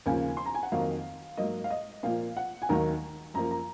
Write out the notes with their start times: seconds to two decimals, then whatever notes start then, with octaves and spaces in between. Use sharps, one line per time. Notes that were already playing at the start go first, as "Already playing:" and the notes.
0.06 D#2 C#3 F3 A#3 G#5
0.37 C6
0.46 A#5
0.55 G#5
0.63 F#5
0.72 F2 D#3 F#3 A#3 F5
1.37 G#2 F#3 A#3 D#5
1.64 F5
1.70 D#5
2.03 A#2 F3 A#3 F5
2.37 F#5
2.62 G#5
2.69 D#2 D#3 F#3 A#3 A#5
3.34 F#2 F3 A#3 A#5
3.51 A#5